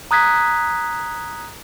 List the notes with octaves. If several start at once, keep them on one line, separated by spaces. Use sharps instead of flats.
A#5 D#6 F#6 G#6 B6